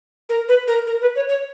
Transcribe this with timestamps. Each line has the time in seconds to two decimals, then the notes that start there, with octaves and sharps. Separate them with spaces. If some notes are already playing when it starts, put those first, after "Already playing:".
0.29 A#4
0.48 B4
0.67 A#4
0.87 A#4
1.01 B4
1.16 C#5
1.29 C#5